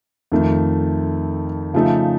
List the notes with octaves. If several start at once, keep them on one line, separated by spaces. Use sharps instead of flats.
F2 D#3 A3
C#3 F3 A3 D#4 A4